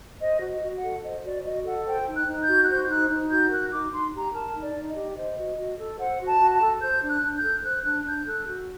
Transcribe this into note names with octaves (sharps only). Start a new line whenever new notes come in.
C5 D#5
F#4
D#5
F#4
F#5
A4
C5 D#5
F#4 D5
F#4 D#5
A4 F#5
C5 G5
D#4
F#6
D#4
G6
F#4
F#6
C5 G6
D#4 F#6
D#4
F#4 G6
A#4 F#6
D#4 D6
D#4 C6
G4 A#5
A#4 A5
D#4
D5
D#4
D#5
G4
C5 D#5
F#4
F#4
A4
C5 F#5
F#4
A5
F#4
A5
A4
C5 G6
D4
F#6
D4
G6
A4
C5 F#6
D4 F#6
D4 G6
A4 F#6
F#4